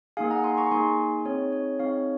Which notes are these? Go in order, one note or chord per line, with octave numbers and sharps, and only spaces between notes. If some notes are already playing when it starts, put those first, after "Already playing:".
A#3 D#4 G#4 F5 G#5
F#5 A#5
G#5 C6
A#5 C#6
A#3 D#4 G#4 G#5 C6
C4 D#4 G#4 C#5
C#5
C4 D#4 G#4 C#5 F5